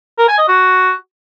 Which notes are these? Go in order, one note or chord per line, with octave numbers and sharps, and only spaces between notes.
A#4
G#5
D#5
F#4